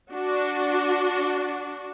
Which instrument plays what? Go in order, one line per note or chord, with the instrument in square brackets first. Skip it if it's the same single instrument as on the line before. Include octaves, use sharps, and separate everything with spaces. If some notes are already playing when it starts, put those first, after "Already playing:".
[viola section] D4 F#4